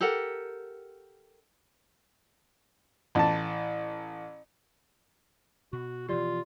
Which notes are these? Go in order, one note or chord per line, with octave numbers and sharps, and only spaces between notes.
G4 A4 A#4 F#5
A1 A5
B2 F#4
B2 E3 F3 F4 G4 D5